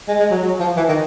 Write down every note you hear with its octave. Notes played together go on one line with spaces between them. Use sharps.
G#3
G#3
F#3
F#3
F3
E3
D#3